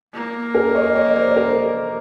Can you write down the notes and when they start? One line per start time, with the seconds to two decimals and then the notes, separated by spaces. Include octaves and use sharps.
0.14 A#3
0.54 G#4 A#4
0.75 C#5 D#5
0.95 C#5 D#5
1.16 C5 D5
1.36 A#4 C5